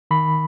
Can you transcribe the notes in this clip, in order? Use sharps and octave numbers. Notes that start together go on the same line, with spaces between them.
D#3 B5